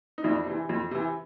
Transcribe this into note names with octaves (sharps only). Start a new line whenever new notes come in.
D#4
F2 D4 E4
C3 E3
F2
C3 E3